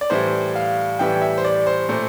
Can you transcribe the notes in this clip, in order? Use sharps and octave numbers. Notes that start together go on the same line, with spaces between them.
D5
A2 E3 G3 C5
F5
A2 E3 G3 G5
E5
C5
D5
C5
A#2 A3 C5